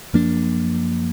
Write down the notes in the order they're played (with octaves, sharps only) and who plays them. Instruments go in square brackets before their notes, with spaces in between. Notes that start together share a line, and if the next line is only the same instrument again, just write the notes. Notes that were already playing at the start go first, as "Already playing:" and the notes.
[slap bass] F#2 F3 A#3 D4